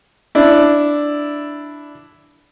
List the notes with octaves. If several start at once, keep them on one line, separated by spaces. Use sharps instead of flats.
D4 E4